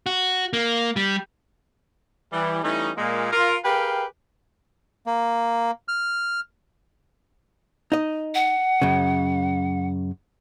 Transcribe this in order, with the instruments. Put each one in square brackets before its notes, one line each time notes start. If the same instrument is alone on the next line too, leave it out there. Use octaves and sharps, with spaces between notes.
[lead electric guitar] F#4
A#3
G3
[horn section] E3 G3
E3 G3 A3 C#4 D#4
A#2 G#3 A#3
F4 A#4
G4 G#4 A#4 B4 F5 G5
[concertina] A#3
F6
[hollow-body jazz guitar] D#4 D#5
[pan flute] F#5
[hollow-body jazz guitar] F#2 C#3